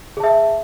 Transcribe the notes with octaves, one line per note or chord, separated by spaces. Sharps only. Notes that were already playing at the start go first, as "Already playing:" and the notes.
G#4 E5 A5